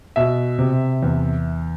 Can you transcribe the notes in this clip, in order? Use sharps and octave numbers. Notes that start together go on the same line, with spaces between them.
B2 E5
C3
E2